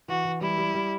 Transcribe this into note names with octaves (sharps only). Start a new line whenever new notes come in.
E3 F#4
E3
G3 E4
G3
G3